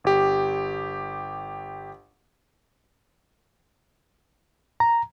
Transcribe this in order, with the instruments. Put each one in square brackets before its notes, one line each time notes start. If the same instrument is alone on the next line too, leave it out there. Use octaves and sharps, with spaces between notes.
[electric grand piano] G1 G4
[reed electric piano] A#5